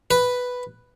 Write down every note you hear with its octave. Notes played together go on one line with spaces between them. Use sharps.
B4